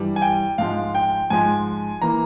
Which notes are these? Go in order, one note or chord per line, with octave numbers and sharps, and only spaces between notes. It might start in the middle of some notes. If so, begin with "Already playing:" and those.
Already playing: G2 E3 G3
G#5
G5
G#2 F3 G#3 F5
G5
G#2 F3 G#3 G#5
E3 A#3 A#5